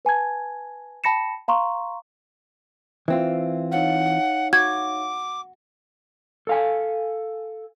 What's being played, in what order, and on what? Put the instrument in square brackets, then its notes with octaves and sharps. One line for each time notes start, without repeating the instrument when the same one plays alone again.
[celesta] B4 G#5 A5 G#6
G5 A5 B5 A#6 C#7 E7
F5 A#5 C6 C#6
[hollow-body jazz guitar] E3 C4 F4 [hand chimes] E5
[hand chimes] D#4 C#5 F5 [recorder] F#5
[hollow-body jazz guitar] F#4 [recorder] D6 [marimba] G#6
[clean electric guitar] A4 F5 G#5